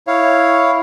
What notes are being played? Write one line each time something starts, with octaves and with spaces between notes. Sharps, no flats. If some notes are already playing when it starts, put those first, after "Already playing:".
E4 C#5 F5